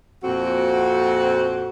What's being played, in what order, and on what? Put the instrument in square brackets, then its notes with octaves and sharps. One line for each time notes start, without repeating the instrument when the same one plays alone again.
[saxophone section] F2 A#2 C4 F#4